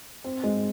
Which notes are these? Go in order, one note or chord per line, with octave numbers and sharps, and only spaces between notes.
C4
G#3